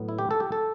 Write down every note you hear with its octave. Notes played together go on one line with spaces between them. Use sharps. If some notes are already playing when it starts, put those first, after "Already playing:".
Already playing: A2 F#3 B3
E4
G4
A4
G4
A4